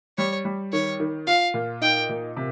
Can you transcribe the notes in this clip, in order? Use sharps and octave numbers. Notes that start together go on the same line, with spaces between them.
G3 C#5
G3
D#3 C#5
D#3
F4 F5
A#2
D#4 G5
A#2
C3